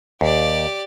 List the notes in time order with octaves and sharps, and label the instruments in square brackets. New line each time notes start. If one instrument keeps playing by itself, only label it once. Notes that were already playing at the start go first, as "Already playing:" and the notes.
[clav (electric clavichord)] D#2 [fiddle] G4 D5